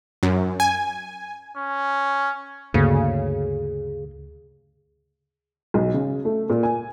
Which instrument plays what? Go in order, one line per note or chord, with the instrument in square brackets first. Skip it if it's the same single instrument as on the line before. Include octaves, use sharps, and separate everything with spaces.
[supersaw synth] F#2
G#5
[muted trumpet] C#4
[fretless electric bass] D2 G2 A#3 [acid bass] C#3
[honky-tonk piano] B1
C#3
A3
A#2
G#5